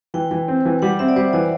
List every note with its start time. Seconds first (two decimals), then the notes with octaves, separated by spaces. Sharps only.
0.14 E3 G5
0.31 E3
0.48 C4
0.65 E3
0.82 G3 F#5
0.99 C4 E5
1.08 D5
1.16 G3 C5
1.33 E3 D5